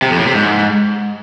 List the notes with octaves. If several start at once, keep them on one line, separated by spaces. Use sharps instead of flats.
C3
F2
A2
C3
G#2